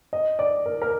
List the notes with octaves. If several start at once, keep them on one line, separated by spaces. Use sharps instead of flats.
D#5
D5
A#4
A#4